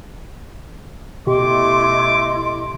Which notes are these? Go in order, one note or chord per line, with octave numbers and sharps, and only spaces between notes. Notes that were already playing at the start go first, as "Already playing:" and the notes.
B2 A3 E4 G4 D#5 C6 D6